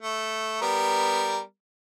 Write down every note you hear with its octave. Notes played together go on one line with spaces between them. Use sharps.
A3
G3 B3 A#4